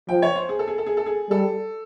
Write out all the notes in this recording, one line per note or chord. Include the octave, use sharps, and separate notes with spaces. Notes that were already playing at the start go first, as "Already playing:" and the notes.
F3 G5
C#5
C5
G#4
A4
G#4
A4
G#4
A4
G#4
G3 A4